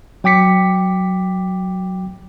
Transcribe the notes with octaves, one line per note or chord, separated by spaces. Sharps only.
F#3 G5 D6 B6 C#7